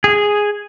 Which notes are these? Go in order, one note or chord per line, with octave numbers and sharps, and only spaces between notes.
G#4